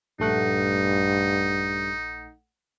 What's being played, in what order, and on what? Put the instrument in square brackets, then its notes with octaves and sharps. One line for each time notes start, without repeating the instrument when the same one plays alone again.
[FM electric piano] A#1 A3 F#5 [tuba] G2 [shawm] D#4